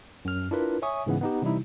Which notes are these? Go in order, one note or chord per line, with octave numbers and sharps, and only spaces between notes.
F#2 F6
D4 E4 F4 A#4 B4
C#5 E5 G#5 C#6 D#6
G#2 C#3 E3 G#3 B3
B3 D#4 G4
C3 E3 G3 D#4 E4